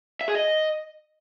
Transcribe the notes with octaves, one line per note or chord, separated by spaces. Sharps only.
E5
G#4
D#5